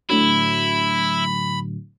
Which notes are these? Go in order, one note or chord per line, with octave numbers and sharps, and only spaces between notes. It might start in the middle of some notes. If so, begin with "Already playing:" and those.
A2 D3 F#3 E4 B5